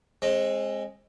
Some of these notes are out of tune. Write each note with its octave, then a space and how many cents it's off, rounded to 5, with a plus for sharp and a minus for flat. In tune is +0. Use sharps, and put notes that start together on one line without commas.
G#3 +0 C4 +30